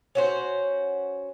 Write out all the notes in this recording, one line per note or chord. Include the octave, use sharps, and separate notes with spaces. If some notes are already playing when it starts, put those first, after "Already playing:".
C#4 F#4 C5